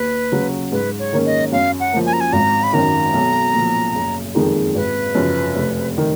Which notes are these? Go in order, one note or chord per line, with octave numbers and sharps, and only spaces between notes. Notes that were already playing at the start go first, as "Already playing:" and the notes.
Already playing: D#2 B4
C#3 F#3
G#2 B4
C#5
D#3 A#3 C#4
D#5
F#2 F5
F#5
F3 A#3
G#5
A#5
G#5
G#1 A#5
B5
F#2 D#3 A#5
B1
A#2 F3
F#1
F2 D#3 G#3 D#4
G#1 B4
F#2 C#3 F3
F1
D#3